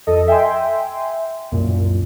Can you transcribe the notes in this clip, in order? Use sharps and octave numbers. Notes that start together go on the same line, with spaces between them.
F2 A4 D#5
E5 G5 G#5 C6
C2 F#2 A#2